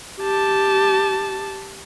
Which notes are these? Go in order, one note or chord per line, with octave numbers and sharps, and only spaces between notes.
G4 A5